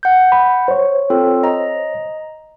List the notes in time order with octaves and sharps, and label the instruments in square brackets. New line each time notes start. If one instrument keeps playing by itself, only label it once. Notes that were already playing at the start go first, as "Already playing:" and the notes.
[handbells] F#5 G6
[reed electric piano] B5
C5 C#5
[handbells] C4 F4 A4
D#5 A#5